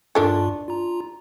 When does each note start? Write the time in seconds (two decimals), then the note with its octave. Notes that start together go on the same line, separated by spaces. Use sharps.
0.15 G2 D#3 D4 F4 A4
0.68 F4 A#5